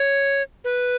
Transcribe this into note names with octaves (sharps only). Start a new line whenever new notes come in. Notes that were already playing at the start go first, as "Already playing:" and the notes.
Already playing: C#5
B4